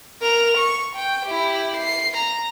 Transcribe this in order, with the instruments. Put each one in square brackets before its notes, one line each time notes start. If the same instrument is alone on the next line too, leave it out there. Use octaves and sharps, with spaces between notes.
[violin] A#4 F7
C#6
G5
E4 G4
C7
A#5